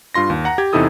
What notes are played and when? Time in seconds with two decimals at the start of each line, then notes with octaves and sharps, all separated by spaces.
0.14 G2 F4 C6 A#6
0.30 D#2
0.45 F#5 A#5
0.58 G4 G#6
0.73 E2 C3 D#4 E4 A4 D#6